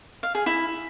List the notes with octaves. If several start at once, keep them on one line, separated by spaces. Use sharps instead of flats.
F5
G#4
E4